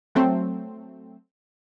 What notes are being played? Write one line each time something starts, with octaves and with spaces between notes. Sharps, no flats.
F#3 A3 C4